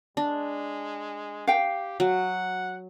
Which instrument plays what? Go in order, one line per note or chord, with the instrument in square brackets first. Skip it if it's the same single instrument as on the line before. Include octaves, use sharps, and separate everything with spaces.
[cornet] G#3 [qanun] D4
[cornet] G4 [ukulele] F5 G5
[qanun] F#3 [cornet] F#5